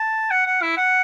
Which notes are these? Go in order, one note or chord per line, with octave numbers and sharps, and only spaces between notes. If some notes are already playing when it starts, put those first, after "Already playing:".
Already playing: A5
F#5
F#5
E4
F#5